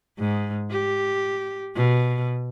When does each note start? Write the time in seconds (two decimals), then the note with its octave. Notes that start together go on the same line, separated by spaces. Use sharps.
0.19 G#2
0.71 G4
1.75 B2